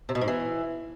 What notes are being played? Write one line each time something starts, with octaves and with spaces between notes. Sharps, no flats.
C3
B2
G#2
E3